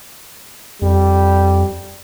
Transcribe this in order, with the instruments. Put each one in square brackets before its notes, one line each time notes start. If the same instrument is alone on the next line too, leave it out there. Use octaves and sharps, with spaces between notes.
[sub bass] F2 [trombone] G3